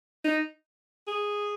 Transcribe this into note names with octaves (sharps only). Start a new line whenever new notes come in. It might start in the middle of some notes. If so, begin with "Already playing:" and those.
D#4
G#4